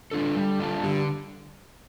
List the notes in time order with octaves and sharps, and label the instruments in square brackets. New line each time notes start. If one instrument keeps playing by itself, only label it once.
[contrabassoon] D3 [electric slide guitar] D4 F4 A4
[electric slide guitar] G3
D4 F4 A4
[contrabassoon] G2 [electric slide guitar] D3